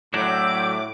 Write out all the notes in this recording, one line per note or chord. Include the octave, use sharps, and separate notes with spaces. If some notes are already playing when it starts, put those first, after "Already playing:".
A2 F#3 D4 E4 F#4 D6 G6